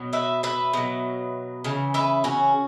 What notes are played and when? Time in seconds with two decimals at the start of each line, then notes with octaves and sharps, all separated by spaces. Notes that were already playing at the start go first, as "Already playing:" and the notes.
Already playing: B2 F#3
0.13 B4 E5
0.43 B4 E5
0.73 B2 F#3
1.64 C#3 E3
1.94 B4 E5
2.24 C#4 F#4